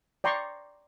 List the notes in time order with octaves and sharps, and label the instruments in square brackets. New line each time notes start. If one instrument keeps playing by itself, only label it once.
[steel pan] D5 G5 A#5 C6 C#6